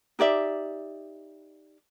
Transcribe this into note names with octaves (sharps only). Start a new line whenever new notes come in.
D#4 G4 D5 E5